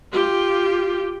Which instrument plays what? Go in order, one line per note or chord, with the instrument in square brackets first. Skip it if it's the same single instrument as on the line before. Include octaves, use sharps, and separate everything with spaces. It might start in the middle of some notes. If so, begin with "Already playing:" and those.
[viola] F4 G4